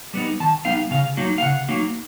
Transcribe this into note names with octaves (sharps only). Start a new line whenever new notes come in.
G3 B3 D#4
D#3 A5
G3 B3 D#4 F5
C#3 F5
F#3 A#3 D#4
F5
C#3 F#5
F#3 A#3 D#4